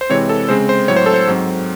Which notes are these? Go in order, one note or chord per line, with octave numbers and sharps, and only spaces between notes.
C5
C3 E3 G#3 C4 C#5
A4
C#3 G#3 C4 C5
C5
A2 F#3 C4 C#5
C5
A4
C5
G#2 F#3 C4